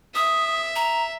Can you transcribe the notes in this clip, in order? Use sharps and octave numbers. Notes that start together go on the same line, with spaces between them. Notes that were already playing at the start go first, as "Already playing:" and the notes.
E5 D#6
A#5